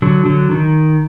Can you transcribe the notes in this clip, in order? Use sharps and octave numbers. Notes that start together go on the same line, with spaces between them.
D3 F#3
D3 F#3
D#3